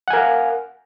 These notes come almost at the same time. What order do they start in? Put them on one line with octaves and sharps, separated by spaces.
F#5 G#5 A#4 F5